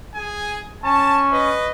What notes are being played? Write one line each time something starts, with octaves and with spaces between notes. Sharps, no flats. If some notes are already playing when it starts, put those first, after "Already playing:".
G#4 G#5
C#4 A5
B4 D#5